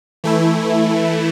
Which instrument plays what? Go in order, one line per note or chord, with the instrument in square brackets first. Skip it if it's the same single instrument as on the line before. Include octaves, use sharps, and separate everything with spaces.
[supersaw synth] E3 A3 E4